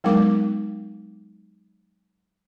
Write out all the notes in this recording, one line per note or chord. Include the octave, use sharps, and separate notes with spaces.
F#3 G#3 B3 D#4 A#4 D6